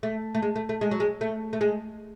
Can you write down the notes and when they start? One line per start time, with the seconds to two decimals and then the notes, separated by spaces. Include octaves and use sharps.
0.03 A3
0.35 A3
0.42 G#3
0.56 A3
0.69 A3
0.81 G#3
0.91 F#3
1.00 G#3
1.21 A3
1.53 A3
1.61 G#3